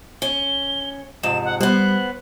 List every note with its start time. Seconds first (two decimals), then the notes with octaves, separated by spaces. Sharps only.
0.22 C#4 G7
1.23 F2 G#2 C3 E7
1.45 F#5
1.61 G3 B3 C5 F#5 F#6